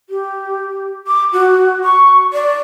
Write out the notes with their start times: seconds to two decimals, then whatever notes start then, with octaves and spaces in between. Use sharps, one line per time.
0.10 G4
1.07 D6
1.33 F#4
1.84 C#6
2.33 D5